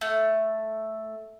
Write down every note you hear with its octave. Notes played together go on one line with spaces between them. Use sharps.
A3